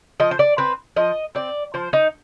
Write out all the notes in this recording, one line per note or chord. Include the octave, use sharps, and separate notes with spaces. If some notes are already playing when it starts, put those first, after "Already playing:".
F3 D#5
C5
D5
C4 B4
F3 D#5
C4 D5
F3 C5
D#4